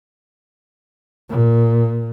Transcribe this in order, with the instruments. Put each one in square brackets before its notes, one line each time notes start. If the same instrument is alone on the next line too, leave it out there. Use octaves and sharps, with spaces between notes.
[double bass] A#2